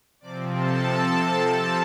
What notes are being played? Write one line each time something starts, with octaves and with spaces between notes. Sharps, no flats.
C3 F3 C4 D5 D6
A4 A5